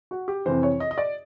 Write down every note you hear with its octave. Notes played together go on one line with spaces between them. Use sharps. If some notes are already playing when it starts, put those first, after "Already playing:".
F#4
G4
F2 C3 E3 C5
C#5
D#5
D#5
D5